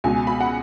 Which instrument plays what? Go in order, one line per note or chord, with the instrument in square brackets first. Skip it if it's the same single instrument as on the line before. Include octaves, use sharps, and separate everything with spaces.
[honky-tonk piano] C#2 B2 G#5
B5
F#5